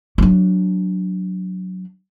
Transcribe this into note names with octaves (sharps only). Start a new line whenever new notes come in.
F#3 D4